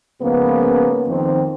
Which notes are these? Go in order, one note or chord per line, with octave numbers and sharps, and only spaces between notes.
G#2 C#3 F3 A#3 B3
F2 D#3 C4